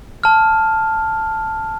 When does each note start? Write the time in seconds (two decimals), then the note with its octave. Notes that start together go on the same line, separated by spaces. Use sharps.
0.24 A5 F6